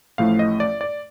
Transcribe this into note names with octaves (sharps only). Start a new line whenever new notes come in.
A1 A2 F3 A3 F5
D#5
D5
D5